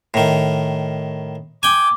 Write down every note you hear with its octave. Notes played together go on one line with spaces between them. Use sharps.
A2 D#3
G5 G#5 D6